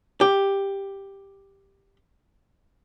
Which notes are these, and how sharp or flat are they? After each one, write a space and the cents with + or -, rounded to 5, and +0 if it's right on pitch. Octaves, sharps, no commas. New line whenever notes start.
G4 +5